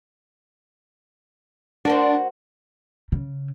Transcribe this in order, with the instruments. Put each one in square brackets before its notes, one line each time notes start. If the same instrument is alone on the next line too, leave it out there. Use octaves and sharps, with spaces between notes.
[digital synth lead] D4 [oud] F#4 A#4 C5
[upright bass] C#3